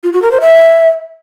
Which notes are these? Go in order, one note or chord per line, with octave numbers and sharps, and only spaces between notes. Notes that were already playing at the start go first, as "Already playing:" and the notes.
F4
F#4
A#4
C5
E5